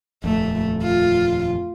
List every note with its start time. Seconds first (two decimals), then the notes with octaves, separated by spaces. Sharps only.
0.24 D#1 F2 A3
0.83 F4